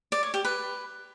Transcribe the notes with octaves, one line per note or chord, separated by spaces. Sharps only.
D5
C#5
G4
B4